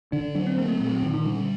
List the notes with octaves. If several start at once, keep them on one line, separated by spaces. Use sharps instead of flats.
D3 D4
F#3 D4
C4
A#3 C4
A3
A#2 A3
F#3
A#2 D#3
D#3
D3 G3